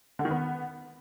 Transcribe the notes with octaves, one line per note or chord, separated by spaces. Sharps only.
D3
D#3
B3